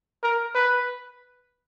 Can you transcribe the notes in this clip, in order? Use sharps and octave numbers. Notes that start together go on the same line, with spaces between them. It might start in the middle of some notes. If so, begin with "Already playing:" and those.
A#4
B4